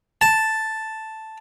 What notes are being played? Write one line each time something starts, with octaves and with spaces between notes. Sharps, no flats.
A5